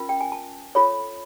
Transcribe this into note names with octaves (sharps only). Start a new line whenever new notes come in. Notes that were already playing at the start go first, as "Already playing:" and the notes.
Already playing: C#4 F4 A#4
G5
G#5
A5
F4 A4 C#5 B5